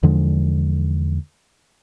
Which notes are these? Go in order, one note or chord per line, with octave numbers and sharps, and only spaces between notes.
E2 D3 F3 G#3